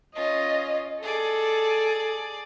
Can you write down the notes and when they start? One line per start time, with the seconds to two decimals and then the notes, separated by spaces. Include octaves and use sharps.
0.16 C#4 F4 D#5
1.03 G#4 A4 D5